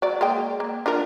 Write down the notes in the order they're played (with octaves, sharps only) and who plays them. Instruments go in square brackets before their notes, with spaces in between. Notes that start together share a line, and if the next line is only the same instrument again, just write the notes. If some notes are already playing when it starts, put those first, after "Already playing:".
[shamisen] F#3 D5
G#3 A#3 G5
A#3
D4 F4 A#4